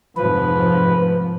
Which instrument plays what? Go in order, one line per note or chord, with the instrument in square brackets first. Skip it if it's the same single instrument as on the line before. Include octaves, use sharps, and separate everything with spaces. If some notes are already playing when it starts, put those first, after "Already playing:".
[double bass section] F1 G#2 F3 [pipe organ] B4